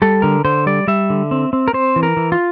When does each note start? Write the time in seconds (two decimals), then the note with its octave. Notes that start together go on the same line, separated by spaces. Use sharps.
0.02 G3 A4
0.22 D3 A#4
0.45 D3 C5
0.66 G3 D5
0.88 G3 E5
1.10 D3
1.31 C4
1.53 C4
1.68 A#4
1.73 C4 C5
1.96 E3
2.03 A#4
2.17 E3
2.32 F4